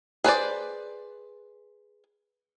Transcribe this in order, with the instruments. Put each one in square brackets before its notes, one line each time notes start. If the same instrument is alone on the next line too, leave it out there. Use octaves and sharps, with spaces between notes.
[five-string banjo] G#4 B4 C5 D5